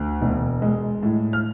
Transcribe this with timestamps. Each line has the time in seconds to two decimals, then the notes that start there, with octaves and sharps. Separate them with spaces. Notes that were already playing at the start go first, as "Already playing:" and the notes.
Already playing: D2
0.21 E1
0.62 G#3
1.03 A2
1.33 F6